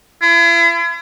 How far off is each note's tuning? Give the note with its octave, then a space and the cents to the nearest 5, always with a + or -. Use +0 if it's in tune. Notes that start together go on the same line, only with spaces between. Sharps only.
E4 +45